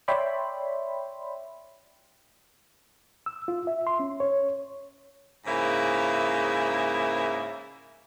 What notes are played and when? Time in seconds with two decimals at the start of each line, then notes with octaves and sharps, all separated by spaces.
0.08 C#5 D5 E5 G5 B5 C6
3.26 E6
3.48 F4
3.67 E5
3.87 C6
4.00 C#4
4.20 C#5
5.46 G#2 C#3 A#3 E4 C5 E5